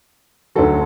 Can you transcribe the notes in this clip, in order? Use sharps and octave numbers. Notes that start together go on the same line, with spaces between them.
D2 D3 F#3 A4